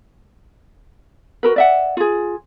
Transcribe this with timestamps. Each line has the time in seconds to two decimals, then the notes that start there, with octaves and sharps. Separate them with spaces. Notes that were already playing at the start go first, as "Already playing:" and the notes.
1.43 F#4 A#4 B4
1.56 D5 E5 F#5
1.97 F4 G#4